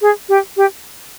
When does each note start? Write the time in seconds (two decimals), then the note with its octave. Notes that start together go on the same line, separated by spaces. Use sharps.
0.02 G#4
0.29 G4
0.57 G4